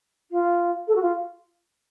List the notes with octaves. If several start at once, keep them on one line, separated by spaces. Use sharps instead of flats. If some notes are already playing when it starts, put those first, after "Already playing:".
F4
A4
F#4
F4